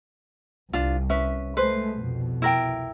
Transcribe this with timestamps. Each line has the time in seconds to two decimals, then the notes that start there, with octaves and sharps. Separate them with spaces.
0.73 C2 D4 F4
1.10 C#4 B4 E5
1.57 G#3 A3 B4 C5
2.01 C2 F2 B2
2.42 E4 A#4 G5